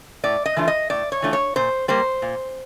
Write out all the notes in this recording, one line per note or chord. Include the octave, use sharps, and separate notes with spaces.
A2 D5
D#5
E3 A3 D4 F4
D#5
A2 D5
C#5
E3 A3 D4 F4
C#5
A#2 C5
G3 A#3 C5
A#2